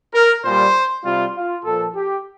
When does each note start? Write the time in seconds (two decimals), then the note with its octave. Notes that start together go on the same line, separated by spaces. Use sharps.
0.14 A#4
0.44 A#2 G3 C5
1.04 C3 G3 F4
1.35 F4
1.65 A#2 F3 A4
1.95 G4